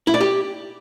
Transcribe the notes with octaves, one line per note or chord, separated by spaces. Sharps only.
E4
D5
G4